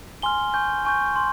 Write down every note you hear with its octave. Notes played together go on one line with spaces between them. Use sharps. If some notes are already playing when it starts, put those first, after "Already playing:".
G#5 C6 F6 G7
G#5 C#6 G6
G#5 C#6 G6
C6